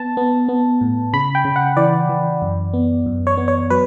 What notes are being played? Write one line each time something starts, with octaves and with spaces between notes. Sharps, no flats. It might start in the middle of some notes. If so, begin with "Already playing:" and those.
Already playing: B3 A5
B3
B3
A2
C#3 B5
G5
C#3
F#5
E3 D5
E3
F#2
B3
F#2
C#5
B3
C#5
F#3 B4